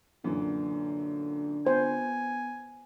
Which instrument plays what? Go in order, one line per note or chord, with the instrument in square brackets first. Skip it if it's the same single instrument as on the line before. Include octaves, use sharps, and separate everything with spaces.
[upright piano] F#2 A#2 E3 [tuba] D3
[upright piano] B3 [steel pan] C5 [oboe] G#5